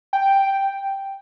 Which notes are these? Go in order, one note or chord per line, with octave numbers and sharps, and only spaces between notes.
G5